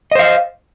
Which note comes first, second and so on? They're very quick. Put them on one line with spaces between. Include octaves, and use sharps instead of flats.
D#5 C5 F5